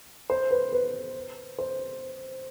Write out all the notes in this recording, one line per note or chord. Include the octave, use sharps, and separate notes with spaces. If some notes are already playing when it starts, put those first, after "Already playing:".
C5
B4
B4
C5